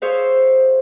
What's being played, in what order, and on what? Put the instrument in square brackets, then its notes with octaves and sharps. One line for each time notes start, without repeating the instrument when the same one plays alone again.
[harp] G#4 C5 C#5 E5 F5